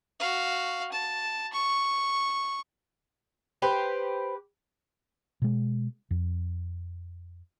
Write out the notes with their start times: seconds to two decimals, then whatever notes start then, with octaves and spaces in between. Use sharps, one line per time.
0.20 F#4 F5
0.92 A5
1.53 C#6
3.62 G4 B4 C5
5.42 B2 G#3
6.11 F2